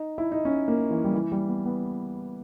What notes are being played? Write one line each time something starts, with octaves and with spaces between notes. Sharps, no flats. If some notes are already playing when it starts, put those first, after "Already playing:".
Already playing: D#4
E4
D#4
C#4
A#3
E3
G3
E3
G3
B3
B3